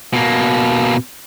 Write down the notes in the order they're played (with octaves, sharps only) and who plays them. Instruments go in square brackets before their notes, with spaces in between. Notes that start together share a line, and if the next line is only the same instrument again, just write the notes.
[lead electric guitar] B2 A#3